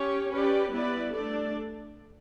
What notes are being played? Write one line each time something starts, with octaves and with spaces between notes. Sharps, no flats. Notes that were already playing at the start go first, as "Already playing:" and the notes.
Already playing: C#4 G4 C#5
C#4 G4 B4 D5
G3 B3 E4 B4 D5
A3 D4 A4 D5